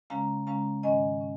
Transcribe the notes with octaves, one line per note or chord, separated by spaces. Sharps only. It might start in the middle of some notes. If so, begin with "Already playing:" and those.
C#3 G#3 C#4 F5 A#5
C#3 G#3 C#4 F5 A#5
G#2 D#3 G#3 C#4 D#5 G#5
C#4